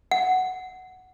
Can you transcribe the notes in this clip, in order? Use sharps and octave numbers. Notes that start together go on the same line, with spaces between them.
F#5